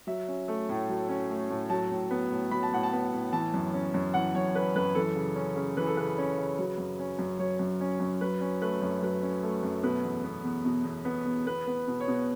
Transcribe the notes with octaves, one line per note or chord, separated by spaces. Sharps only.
F#3 E5
C#4
A3
A2
F#3
C#4
A3
A2
F#3 A5
A2
B3
A2
F#3 B5
A5
A2 F#5
A5
B3
A2
E3 A5
F#2
C#4
F#2
E3 F#5
F#2 C#5
C#4 B4
F#2 B4
E3 A4
C#3
C#4
C#3
E3 B4
A4
C#3 B4
C#4
C#3
F#3
F#2
C#4
F#2
F#3 C#5
F#2
C#4
F#2
F#3 B4
C#4
A3 B4
F#2
F#3 B4
C#4
A3
F#2
B2 B4
E2
B3
E2
B2
E2
B3
E2
B3 B4
B3
B2
C#5
B2